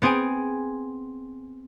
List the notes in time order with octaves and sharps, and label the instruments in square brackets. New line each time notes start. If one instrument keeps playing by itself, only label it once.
[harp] B3 C4 G#4 G#5 D7